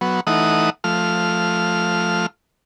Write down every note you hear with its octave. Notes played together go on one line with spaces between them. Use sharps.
F#3 B3
E3 A3 D#4 F#5 D#6
F3 A3 F6